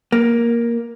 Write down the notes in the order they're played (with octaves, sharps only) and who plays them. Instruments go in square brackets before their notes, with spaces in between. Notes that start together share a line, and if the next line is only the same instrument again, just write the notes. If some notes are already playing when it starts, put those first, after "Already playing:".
[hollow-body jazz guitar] A#3